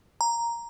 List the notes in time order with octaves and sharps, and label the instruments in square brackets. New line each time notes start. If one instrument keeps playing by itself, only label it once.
[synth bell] A#5